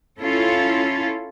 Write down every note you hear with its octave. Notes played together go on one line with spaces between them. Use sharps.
C#4 E4 F4 A4